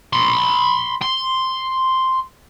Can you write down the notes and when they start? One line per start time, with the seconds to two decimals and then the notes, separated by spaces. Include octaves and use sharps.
0.13 B5 C6
1.02 C6